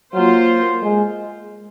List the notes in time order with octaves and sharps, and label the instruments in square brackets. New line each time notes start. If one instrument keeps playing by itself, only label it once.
[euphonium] F#3 [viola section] A#3 F4 C5
[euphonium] G#3